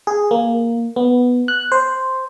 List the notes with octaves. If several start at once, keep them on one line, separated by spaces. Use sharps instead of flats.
G#4
A#3
B3
F#6
C5